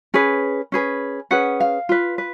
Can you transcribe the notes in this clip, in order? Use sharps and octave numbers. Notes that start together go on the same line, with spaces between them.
C#4 G#4 B4
C#4 G#4 B4
C#4 G#4 B4 F#5
F5
F4 B4
B4